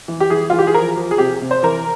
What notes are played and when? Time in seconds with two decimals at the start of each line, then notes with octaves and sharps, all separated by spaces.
0.08 E3
0.20 G4
0.30 E3 G#4
0.50 E3 F4
0.59 G4
0.67 G#4
0.74 F3 A#4
0.96 F3
1.11 G#4
1.18 C3 G4
1.42 C3
1.51 C5
1.63 E3 A#4